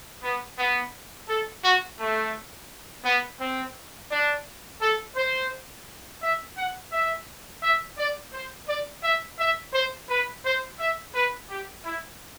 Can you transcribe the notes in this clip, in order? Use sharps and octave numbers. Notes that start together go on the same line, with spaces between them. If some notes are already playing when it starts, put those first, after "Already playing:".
B3
B3
A4
F#4
A3
B3
C4
D4
A4
C5
E5
F#5
E5
E5
D5
C5
D5
E5
E5
C5
B4
C5
E5
B4
G4
E4